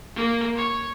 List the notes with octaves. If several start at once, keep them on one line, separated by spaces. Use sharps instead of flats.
A#3
C#5